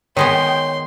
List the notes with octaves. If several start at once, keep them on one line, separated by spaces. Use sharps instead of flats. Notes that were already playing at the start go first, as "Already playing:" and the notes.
D#3 G#3 B3 C#5 G5 C6